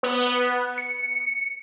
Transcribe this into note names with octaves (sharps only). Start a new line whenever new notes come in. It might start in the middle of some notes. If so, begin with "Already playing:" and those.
B3
C#7